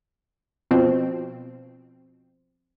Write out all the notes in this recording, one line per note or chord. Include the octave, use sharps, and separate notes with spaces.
B2 F3 C4